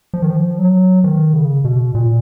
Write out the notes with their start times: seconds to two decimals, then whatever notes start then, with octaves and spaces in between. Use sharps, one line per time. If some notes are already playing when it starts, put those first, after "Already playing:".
0.14 F3
0.22 D#3
0.30 F3
0.58 F#3
1.04 D#3
1.33 C#3
1.65 B2
1.95 A#2